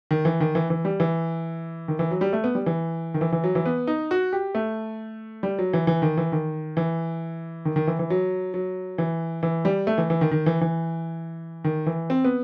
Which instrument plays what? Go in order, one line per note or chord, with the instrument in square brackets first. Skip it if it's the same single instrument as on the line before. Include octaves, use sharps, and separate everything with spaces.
[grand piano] D#3
E3
D#3
E3
E3
G3
E3
D#3
E3
F#3
G3
A3
B3
G3
E3
D#3
E3
E3
F#3
E3
B3
D#4
F#4
G4
A3
G3
F#3
E3
E3
D#3
E3
D#3
E3
D#3
D#3
E3
E3
F#3
F#3
E3
E3
G3
A3
E3
E3
D#3
D#3
E3
E3
D#3
E3
C4
B3